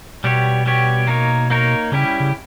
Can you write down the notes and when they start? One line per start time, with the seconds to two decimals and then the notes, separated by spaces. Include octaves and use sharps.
0.24 B2 G3 B3 G4 C#5
0.66 G3 B3 G4 C#5
1.07 A#3 D#4 A#4 C#5
1.50 A#3 D#4 A#4 C#5
1.92 C#3 G3 C#4 E4 G4
2.20 C#3